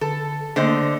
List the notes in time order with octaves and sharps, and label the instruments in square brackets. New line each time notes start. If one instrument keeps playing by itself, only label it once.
[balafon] D3 [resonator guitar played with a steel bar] A4
[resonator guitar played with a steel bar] D3 C5 D#5 [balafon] A3 A#3 D4